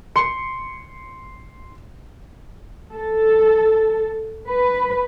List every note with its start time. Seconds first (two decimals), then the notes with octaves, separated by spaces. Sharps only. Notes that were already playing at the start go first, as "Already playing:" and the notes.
0.16 C6 C#7
2.93 A4
4.48 B4